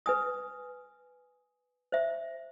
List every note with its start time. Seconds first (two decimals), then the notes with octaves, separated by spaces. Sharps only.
0.06 B4 G#5 D#6
1.92 C5 E5